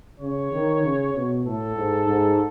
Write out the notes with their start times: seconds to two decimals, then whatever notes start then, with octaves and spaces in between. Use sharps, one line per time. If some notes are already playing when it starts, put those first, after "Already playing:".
0.20 C#3 C#5
0.52 D#3
0.84 C#3
1.14 B2
1.45 A2 A4
1.76 G#2
2.07 G#2